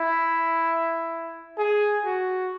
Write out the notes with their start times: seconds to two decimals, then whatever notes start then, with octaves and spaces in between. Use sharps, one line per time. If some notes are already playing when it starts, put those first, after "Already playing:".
Already playing: E4
1.58 G#4
2.05 F#4